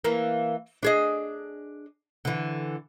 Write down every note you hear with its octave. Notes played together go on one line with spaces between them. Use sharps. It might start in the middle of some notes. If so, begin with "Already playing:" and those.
E3 A#3
D4 G#4 D#5
D3 E3